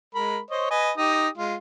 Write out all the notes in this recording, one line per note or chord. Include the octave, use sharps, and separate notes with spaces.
G#3 A#4 B5
C5 C#5 D#5
B4 D#5 G#5
D#4 G4 D#6
G#3 F4